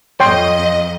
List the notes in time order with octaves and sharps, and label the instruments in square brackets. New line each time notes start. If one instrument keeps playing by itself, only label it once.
[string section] F2 D#5 [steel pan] C#5 G5 C6